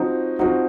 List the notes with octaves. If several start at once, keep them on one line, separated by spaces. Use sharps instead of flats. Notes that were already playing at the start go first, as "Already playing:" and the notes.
Already playing: F3 C4 D#4 F#4
F3 C4 D#4 F#4